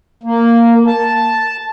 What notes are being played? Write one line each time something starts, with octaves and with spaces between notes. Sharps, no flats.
A#3
A5